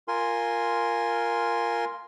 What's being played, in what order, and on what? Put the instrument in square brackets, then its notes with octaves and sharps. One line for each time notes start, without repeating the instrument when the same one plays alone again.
[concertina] F4 A#4 G#5 C6